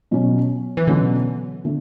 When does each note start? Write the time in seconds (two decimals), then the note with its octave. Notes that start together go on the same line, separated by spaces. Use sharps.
0.11 B2 F#3 C#4
0.77 E3
0.87 B2 D3 F#3 C#4
1.65 D3 A3